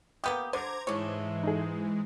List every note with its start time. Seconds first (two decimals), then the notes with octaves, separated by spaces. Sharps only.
0.24 A#3 B3 G4 D#6 G6
0.53 D3 C5 A#5 D6 G#6
0.87 G#2 E3 G#3 A3 C#5
1.43 D#4 G#4